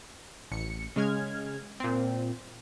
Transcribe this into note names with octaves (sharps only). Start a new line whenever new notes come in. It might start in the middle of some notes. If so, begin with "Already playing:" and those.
A1 C#7
C#3 G#3 F6 G#6
A#2 C4